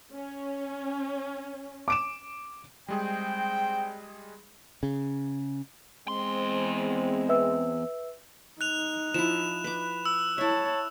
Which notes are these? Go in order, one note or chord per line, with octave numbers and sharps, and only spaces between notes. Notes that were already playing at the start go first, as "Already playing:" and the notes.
C#4
D6 D7 E7
G3 G#3 C4 G#4 G5
C#3
E2 G#3 C4 C6
B4 E5 E6
D#4 F#6 F7
F3 E4 E7
B4 D6
E6
E4 C#5 E5 A5